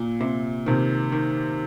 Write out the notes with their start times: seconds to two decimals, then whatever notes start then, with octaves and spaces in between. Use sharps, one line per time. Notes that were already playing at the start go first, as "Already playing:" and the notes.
Already playing: A#2
0.21 C3
0.66 C3 D#3
1.12 D#3